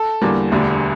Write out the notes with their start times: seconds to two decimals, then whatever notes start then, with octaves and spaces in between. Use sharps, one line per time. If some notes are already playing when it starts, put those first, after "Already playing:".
Already playing: A4
0.22 E2 D3 G3 A#3
0.52 E1 D2 D3 G3